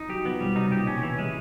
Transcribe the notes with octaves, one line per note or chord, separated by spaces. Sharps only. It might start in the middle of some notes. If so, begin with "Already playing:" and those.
Already playing: D#4
F#3 G4
F3 B3
B2 G3
C3 D#4
A#2 G4
B2 C#4
E3
G#3